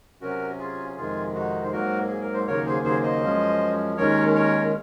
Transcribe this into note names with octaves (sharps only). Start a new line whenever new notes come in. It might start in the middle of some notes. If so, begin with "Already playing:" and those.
C3 F#3 C#4 F#4 A#4
F4 G#4
F2 C3 D#3 G#3 F4 G#4
D#4 F#4
C5
G#2 F#3 A#3 F#4 A#4
G#4
A#4
C5
D#2 C#3 F#3 A#3 A#4 C#5
G#4 C5
G#4 C5
C5 D#5
F#2 F3 G#3 C#4
D#2 D#3 G#3 C#4 A#4 C#5
A#4 C#5